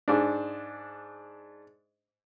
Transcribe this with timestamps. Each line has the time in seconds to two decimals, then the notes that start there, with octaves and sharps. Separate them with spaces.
0.08 G#2 D4